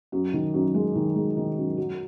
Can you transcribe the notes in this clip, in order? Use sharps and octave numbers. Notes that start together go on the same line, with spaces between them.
F#2
D#3
F#2
G#3
D#3
G#3
D#3
F#2
F#3